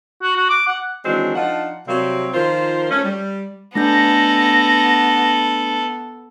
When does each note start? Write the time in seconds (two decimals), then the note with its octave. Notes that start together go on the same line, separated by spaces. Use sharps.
0.23 F#4
0.36 F#4
0.49 D6
0.67 F#5
1.05 D#3 E3 F#3 G#3 C4 D4
1.35 F3 D4 D#4 F4 F#5
1.87 C3 F#3 G3 A#3 C4
2.34 D#3 F3 F4 A#4 C5
2.91 A3 C#4
3.05 G3
3.75 A3 B3 D4 A4 G6 A#6